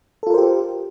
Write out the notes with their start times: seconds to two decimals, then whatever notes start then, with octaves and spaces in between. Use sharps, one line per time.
0.23 A4
0.27 F4
0.30 A#4
0.34 C5
0.38 G4